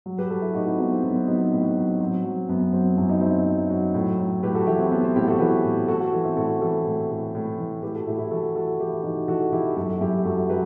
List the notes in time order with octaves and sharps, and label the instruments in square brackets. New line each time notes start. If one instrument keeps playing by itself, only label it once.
[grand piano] F#3
G4 B4
F#3 F#4 A4
E4 G4
A2 D#4 F#4
C4 E4
F#3 B3 D#4
C4
F#3 B3
C4
F#3 B3 D#4
C4
A2
F#3
F#3 C4
F#3
F#2 B3
F#3 C4
F#2 E4
D#4
F#3 C4 E4
F#3
F#3
A2
A2
A2 G4 B4
F#4 A4
E3 E4 G4
C4
A2 B3
C4
A2 E4 G4
F#4 A4
E3 G4 B4
A2
A2 F#4 A4
F#4 A4
E3
C4 E4
A2 F#4 A4
E3 F#4 A4
A2
A2
A2
E3
A2 G4 B4
F#4 A4
A2 E4 G4
E4 G4
E3 F#4 A4
E3 F#4 A4
E3 E4 G4
E3 D#4 F#4
E3 F#4 A4
E3 E4 G4
F#2 F#4 A4
F#2 E4 G4
F#2 F#4 A4
F#3 G4 B4